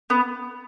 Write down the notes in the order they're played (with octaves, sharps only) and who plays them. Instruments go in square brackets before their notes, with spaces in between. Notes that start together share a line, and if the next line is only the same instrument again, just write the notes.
[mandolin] B3